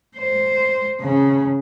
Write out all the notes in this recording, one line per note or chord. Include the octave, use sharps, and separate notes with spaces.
C5
C#3